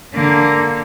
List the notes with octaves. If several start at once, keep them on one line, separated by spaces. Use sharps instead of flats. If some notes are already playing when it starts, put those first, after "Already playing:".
D3 A#3